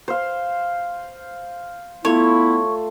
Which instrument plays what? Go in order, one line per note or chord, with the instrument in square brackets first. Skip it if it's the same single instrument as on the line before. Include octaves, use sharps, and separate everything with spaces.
[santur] C5 F5
[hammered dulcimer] A3 F4 [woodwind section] B3 E4 [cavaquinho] C#5